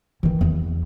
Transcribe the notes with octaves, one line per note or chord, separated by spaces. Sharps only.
D#3 E3
E2